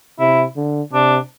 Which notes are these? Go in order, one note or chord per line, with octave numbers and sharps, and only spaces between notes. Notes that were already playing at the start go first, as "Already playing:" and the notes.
C3 E4
D3
C3 D4